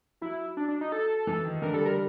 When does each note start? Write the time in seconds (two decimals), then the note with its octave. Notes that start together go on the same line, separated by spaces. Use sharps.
0.22 F#3 E4
0.57 D4
0.69 D4
0.81 D#4
0.92 A4
1.27 E3
1.45 D#3
1.62 D3 A#4
1.74 G3 A4
1.85 G3 A#4